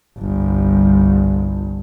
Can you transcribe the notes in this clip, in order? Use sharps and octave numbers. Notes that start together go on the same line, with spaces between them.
G1 C2